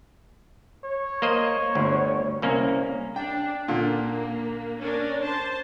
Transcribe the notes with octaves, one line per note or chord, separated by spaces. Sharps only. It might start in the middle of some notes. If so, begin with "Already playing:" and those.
C#5
A#3 C5 D#5
G1 D2
C2 A#3 C#4
D4 G5
A#2 D3 A#3
C#4 D4 A#4
C5 A5